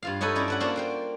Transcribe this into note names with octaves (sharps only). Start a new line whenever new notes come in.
G2 F4 F5
D#4 A4 B4 C#5 D#5
C#4 E4 D5
A4 B4 F#5
A#3 D4 F4 F#4 C5
A#4 C5 G5